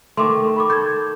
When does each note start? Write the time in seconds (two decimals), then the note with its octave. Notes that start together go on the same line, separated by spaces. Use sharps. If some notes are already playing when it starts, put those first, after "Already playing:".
0.17 D#3 A3 C6 D6
0.56 B5 C#6 D6
0.70 A4 G6 G#6